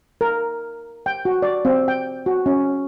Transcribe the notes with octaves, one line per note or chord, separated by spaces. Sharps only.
A#4
G5
F#4
D5
C4
G5
F#4
C#4